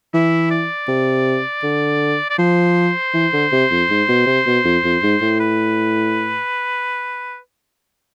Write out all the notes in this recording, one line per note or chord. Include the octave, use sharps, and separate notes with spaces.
E3 E4
D5
C3
D3
D5
F3 C5
E3
D3
C3
F2
G#2
B2
C3
B2
F2
F2
G#2
A2
B4